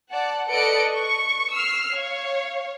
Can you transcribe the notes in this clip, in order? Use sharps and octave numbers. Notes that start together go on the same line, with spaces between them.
D5 F#5 A5
A4 B4 D5 D#5 C#7 D7
C#6
E6 F6 C7
C#5 F5